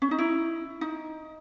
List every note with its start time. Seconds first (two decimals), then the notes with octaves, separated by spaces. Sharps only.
0.02 C#4
0.11 D#4
0.19 E4
0.81 D#4